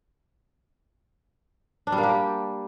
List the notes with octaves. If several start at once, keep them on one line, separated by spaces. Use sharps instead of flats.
D4
G3
A#3
G4